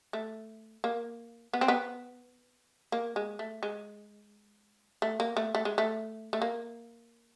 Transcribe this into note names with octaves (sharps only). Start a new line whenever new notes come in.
A3
A#3
B3
C4
B3
A#3
G#3
A3
G#3
A3
A#3
A3
A3
G#3
A3
A3
A#3